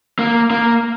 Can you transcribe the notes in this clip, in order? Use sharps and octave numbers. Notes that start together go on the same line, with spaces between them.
A#3
A#3